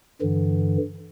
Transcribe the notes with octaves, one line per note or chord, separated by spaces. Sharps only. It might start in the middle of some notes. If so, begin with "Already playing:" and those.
G2 D3 E3